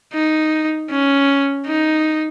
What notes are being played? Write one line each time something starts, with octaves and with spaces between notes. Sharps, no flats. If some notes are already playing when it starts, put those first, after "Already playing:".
D#4
C#4
D#4